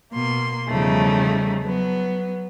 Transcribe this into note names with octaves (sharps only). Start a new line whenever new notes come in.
B2 A#3 C6
E2 C#3 F3 G3 A3 D#4
F#3 B3